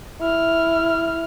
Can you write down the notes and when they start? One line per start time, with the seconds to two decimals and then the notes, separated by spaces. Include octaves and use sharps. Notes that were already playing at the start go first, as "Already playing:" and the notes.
0.21 E4 F6